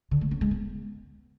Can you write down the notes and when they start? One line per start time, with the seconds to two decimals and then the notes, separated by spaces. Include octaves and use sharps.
0.11 D3
0.21 A3
0.31 C#4
0.41 G#3
0.51 B3